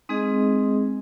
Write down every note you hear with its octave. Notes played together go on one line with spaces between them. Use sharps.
G#3 C4 D#4 G#4 D#5